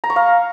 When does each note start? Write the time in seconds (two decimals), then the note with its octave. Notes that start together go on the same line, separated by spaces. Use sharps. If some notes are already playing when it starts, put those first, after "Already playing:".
0.04 A#5
0.10 C#6
0.16 F5